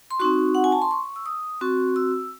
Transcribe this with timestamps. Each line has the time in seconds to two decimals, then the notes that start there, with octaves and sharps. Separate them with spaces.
0.11 C6
0.20 C4 D#4 F#4 C#6
0.55 F#5
0.64 G#5
0.72 A5
0.82 C6
0.91 C#6
1.16 E6
1.26 D#6
1.61 C4 F#4 C#6
1.96 E6